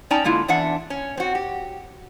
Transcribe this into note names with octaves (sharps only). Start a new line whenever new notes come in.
C#4 D#4 D5 G5 A5 A#5
D3 G#3 A#3 E4 F4
E2 D4 E5 F#5
C#4
C4 F#4
G4